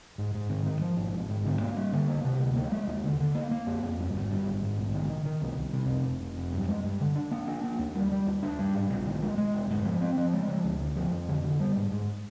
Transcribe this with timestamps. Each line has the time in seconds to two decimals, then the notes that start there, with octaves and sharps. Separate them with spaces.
0.18 G#2
0.34 G#2
0.50 D#3
0.65 D#3
0.81 F3
0.97 G#1
1.14 G#2
1.29 G#2
1.45 D3
1.61 A#3
1.77 G3
1.93 D3
2.08 A#3
2.24 C3
2.40 D2
2.56 A#3
2.72 G#3
2.88 D#2
3.03 D3
3.20 D3
3.35 A#3
3.51 A#3
3.67 F2
3.83 F2
3.99 G2
4.14 G#1
4.31 G2
4.46 G#1
4.62 G#2
4.78 A#1
4.94 D#3
5.10 D#3
5.25 D#3
5.42 C2
5.57 C2
5.73 C3
5.89 F1
6.05 F1
6.21 F1
6.37 F2
6.52 G2
6.68 G#3
6.84 G2
7.00 D3
7.16 D4
7.31 A#3
7.48 D4
7.64 A#3
7.79 D#2
7.95 G3
8.11 G3
8.27 D#2
8.43 D4
8.59 G3
8.75 G#2
8.90 A#1
9.07 D#3
9.22 G#3
9.38 G#3
9.54 F1
9.70 G#2
9.85 F3
10.01 C4
10.17 F3
10.33 G#3
10.48 F3
10.64 D2
10.81 D2
10.96 F3
11.12 F2
11.29 D3
11.44 D3
11.60 G3
11.76 G#2
11.91 G#2